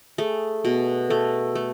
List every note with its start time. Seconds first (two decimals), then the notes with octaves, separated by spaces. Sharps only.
0.18 A3 G#4
0.64 B2 G#4
1.10 A3 A4
1.55 A3